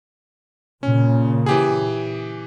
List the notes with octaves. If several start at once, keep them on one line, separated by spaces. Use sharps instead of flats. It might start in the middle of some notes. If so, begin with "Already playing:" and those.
A#2 C#3 C#4
E3 G4 G#4